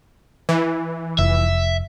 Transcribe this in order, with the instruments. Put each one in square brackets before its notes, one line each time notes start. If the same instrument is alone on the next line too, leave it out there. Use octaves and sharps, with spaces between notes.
[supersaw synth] E3
[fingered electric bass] F1 [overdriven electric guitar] E5